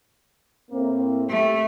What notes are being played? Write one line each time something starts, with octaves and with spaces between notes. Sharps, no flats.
A2 A#3 C4
A3 G4